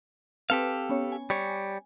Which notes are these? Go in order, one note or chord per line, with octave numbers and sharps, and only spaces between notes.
C4 G4 A4 B4 F5
B3 C#4 C#5
G#5
G3 C#5